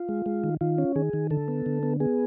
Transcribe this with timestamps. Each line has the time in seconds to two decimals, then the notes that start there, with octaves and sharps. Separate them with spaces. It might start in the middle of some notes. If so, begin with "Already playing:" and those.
Already playing: F4
0.09 G#3
0.26 G#3
0.44 D#3
0.61 D#3 F4
0.78 C#4
0.96 D#3 G#4
1.13 D#3
1.30 D3 A4
1.48 B3
1.66 D3
1.83 B3
2.00 B3 G#4